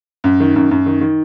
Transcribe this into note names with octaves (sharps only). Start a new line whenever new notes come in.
F#2
D#3
F#2
F#2
D#3
D#3